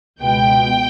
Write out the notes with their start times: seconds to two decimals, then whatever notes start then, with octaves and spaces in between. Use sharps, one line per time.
0.21 C#2 B2 G#3 B3 G5